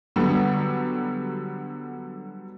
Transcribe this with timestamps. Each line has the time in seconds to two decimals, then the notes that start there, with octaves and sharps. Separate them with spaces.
0.16 D3 F#3 G3 B3